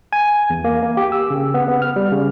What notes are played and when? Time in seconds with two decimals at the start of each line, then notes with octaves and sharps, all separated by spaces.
0.13 G#5
0.50 E2
0.64 A#3
0.82 A#3
0.97 G4
1.12 E6
1.30 C#3
1.54 B3
1.68 B3
1.82 F6
1.96 G3
2.12 C#3